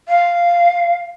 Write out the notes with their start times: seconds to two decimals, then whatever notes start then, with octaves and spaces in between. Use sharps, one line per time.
0.08 F5